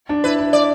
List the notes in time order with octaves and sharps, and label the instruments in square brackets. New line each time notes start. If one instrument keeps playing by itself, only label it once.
[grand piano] D4
[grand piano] E4 [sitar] B4
[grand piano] E4
[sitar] D5